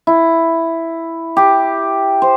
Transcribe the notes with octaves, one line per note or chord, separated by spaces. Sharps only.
E4
G4
C5